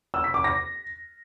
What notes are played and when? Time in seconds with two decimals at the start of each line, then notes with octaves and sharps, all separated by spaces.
0.14 E6
0.24 B6
0.34 D6
0.44 A#6